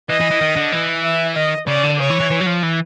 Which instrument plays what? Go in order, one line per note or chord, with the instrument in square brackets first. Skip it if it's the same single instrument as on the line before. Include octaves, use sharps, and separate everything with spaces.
[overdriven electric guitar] E3 [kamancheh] D#5
[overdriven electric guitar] E3
E3
D#3
D3
E3
[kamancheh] E5
[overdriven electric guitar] D#3 [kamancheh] D#5
[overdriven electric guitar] C#3 [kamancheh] D5
[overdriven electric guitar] D3
[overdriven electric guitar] C#3 [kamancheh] C#5
[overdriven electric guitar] E3
E3
E3
F#3
F3
E3